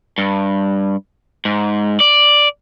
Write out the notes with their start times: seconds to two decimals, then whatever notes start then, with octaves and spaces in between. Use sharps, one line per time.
0.18 G2
1.45 G#2
2.00 D5